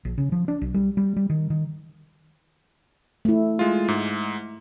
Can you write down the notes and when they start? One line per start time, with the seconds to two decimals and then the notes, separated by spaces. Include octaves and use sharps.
0.05 A#1
0.18 C#3
0.32 F3
0.48 D4
0.62 B1
0.74 G3
0.97 G3
1.16 G3
1.30 D#3
1.50 D#3
3.25 A3 E4
3.59 G#3 F4
3.88 G#2